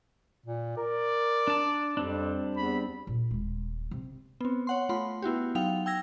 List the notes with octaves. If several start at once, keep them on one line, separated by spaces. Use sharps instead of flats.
A#2
A#4 D5
D4 A5
F2 G3 C4 D4
E2 B5
A#2
D#1 G#3
C3
B3 C4
C#5 F#5 C6
A3 F4 B5 C6
B3 E4 F#4 G4
F#3 D#4 F5 G5 F7
G5 E6 G#6 A#6